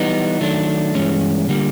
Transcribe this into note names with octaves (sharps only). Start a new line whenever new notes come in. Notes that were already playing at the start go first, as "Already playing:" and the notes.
Already playing: E3 G3 B3 D#4
D#3 F#3 A3 D4
G2 E3 G#3 C#4
D3 G3 A#3